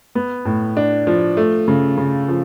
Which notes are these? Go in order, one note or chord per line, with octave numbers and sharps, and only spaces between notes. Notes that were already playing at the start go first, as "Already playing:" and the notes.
B3
A2
D4
F3
A3
C#3
C#3
F3